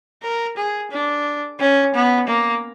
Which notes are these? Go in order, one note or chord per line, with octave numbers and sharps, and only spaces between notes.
A#4
G#4
D4
C#4
B3
A#3